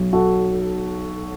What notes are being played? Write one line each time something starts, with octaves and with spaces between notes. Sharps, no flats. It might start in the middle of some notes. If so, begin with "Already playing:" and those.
Already playing: B1 B2 F#3
F#4 A4